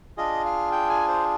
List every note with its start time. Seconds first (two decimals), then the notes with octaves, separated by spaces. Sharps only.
0.17 D4 F4 G#4 D#5
0.45 F5
0.72 G5
0.90 G#5
1.08 C5